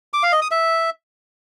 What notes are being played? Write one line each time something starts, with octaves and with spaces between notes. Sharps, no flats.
D6
F5
D#5
D#6
E5